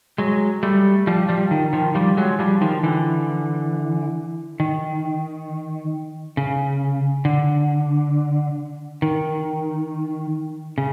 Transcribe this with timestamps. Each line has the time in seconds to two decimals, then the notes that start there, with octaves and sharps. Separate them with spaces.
0.18 F#3 G#3
0.63 G3 A3
1.07 F3 G3
1.29 F3 G3
1.51 D#3
1.73 D#3 F3
1.95 F3 G3
2.17 F#3 G#3
2.39 F3 G3
2.61 D#3 F3
2.83 D3 E3
4.60 D#3
6.37 C#3
7.25 D3
9.02 D#3
10.78 C#3